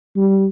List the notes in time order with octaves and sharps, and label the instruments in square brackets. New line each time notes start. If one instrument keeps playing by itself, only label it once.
[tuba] G3